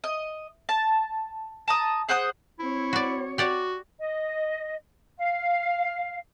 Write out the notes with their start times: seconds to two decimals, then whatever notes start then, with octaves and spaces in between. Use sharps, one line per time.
0.04 D#5
0.69 A5
1.68 A5 A#5 D#6
2.09 G#4 C5 F#5 D#6
2.59 C4 E4 C#5
2.93 F#4 D5
3.38 F#4 G4 D5 F#5
4.00 D#5
5.18 F5